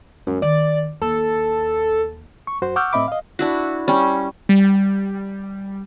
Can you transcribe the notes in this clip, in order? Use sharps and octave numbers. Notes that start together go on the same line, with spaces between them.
F#2 G#3
D#3 D5
D#2 A4
C#6
F#2 F#4 C5
F#5 C#6 D6 E6 F6 G6
A2 C4 D#5 E5 B5 D6
D#5 F5
D4 E4 F#4
G3 C#4
G3